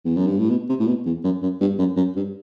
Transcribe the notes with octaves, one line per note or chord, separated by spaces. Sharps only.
E2
F#2
G2
A2
B2
C3
A2
B2
E2
F#2
F#2
G2
F#2
F#2
G2